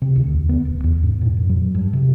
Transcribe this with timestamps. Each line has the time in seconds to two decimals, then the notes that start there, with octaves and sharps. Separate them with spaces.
0.02 C3
0.16 D2
0.34 D#2
0.49 B3
0.65 D1
0.84 E2
1.03 G#2
1.21 A#2
1.37 F2
1.49 F#3
1.75 G2
1.93 C3